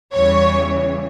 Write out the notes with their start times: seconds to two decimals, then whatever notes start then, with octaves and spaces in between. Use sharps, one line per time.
0.14 E2 C#3 E3 G3 C#5